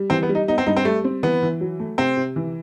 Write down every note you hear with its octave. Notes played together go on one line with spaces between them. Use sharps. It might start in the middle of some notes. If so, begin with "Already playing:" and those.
Already playing: G3
E3 C4
B3
G3
D#4
B3 D#4
C4
G2 D#4
C4
G3 A3
C4
E3 B3
E3
F#3
A3
C3 C4
C3
E3